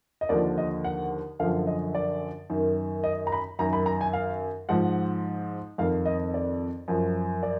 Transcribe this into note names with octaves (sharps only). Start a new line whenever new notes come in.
D#5
D#2 D3 F3 D5
D#5
F#5
F#2 D3 F3 F5
D#5
D5
F#2 D#3
D#5
A#5
B5
F#2 D#3 A#5
B5
A#5
G#5
F5
G#2 F3 F#5
F2 D#3 F5
D#5
D5
F#2 F3
D5